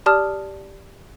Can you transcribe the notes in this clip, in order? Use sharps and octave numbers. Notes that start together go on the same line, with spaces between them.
G4 D5 A5 D#6 F6